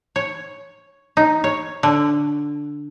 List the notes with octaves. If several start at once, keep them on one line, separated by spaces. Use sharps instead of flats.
C#5
D#4
C#5
D3